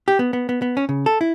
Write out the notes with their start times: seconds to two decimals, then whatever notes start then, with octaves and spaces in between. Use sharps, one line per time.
0.08 G4
0.19 B3
0.33 B3
0.49 B3
0.62 B3
0.77 C#4
0.89 C#3
1.06 A4
1.21 E4